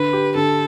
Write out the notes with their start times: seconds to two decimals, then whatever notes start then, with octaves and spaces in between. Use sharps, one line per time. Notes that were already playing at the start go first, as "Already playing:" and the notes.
Already playing: D3 B4
0.13 G4
0.35 D3 A4